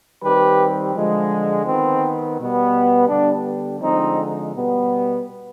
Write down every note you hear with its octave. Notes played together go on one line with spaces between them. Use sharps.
D#3 G3 C4 G4 B4
D3 F3 G#3
D#3 B3 C4
B2 G3 B3
D3 G3 B3 D4
D3 F3 G#3 C4 D#4
B2 G3 B3